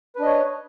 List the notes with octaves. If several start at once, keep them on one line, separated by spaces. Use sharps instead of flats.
D4 B4 C#5 D#5